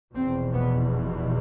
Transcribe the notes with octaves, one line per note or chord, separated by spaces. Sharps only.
F1 E2 B2 C4
B3